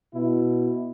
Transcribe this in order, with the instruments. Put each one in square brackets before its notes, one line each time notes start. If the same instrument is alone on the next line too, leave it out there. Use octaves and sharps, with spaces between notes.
[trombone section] B2 E4